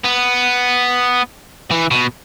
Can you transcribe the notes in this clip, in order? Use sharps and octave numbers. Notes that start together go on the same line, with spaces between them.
B3
E3
B2